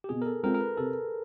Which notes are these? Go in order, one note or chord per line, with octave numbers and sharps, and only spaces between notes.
G4
B2 G#4
A#4
A4
G#3 C4 F4 A#4
A#4
B4
C3 A4